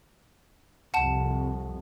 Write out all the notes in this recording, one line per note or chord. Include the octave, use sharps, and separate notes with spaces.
C2 F2 F#5 A5 E7